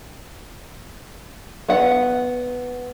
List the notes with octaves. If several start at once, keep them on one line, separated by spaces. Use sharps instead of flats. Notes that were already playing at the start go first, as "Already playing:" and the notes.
B3 F#5